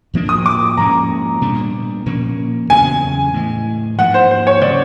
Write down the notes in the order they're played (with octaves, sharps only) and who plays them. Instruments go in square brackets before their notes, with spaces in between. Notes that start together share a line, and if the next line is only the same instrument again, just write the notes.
[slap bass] A2 F3 A#3 D4
[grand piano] D#6
D6
[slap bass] G#2 F3 A#3 C#4 [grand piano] A#5
[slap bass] A#2 G3 B3 D4
A#2 F3 A#3 C#4
[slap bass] E2 C#3 F#3 B3 [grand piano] G#5
[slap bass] A2 E3 G#3
[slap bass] G#2 F3 A#3 [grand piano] F#5
[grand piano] C5
C5
C#5
[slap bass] C#3 F#3 [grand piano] D5